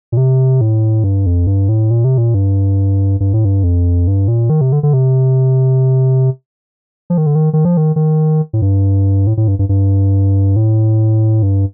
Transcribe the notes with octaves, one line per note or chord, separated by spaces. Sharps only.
A#2
C3
A2
G2
F2
G2
A2
A#2
C3
A#2
G2
G2
A2
G2
F2
G2
A#2
D#3
C3
D3
D3
C3
F3
D#3
D3
D#3
D#3
F3
D#3
D#3
A2
G2
A2
A2
G2
G2
G2
A2
G2